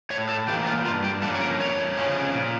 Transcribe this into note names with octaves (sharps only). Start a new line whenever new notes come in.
A2 C#5
A4
E3 A#3 G4
F4
G2 F4
G4
F3 A#3 C#4 A4
C#5
A#4
F2 C#5
C#3 F3 C#4
A#2